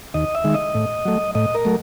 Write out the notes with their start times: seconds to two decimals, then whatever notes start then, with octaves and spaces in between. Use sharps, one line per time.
0.14 D#2 D#5
0.35 E5
0.44 D#3 G#3
0.54 D#5
0.75 A2
1.05 F#3 A3
1.35 A2 D#5
1.55 A#4
1.65 F#3 A3